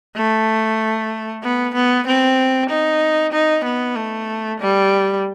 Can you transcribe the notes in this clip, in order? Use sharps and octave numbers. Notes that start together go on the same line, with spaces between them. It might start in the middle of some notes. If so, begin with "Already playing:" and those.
A3
B3
B3
C4
D#4
D#4
B3
A3
G3